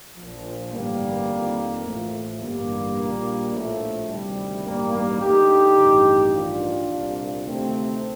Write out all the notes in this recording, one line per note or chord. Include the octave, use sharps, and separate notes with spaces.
A#1 A#2 F3
A1 G2 D3 G3 A#3
F2 D#3
A1 A2 F3 A3
A1 G2 D3 G3 A#3
A#1 A#2
A#1 A2 F3 A3
D2 C3 D#3 G3
A1 G2 D#3 G3 A#3
G3 A#3
D2 D3 D#4 G4
A1 G2 D#3
A1 G2 D#3 D4 F4
C2 A#2
D2 C3 D#3 A3 C4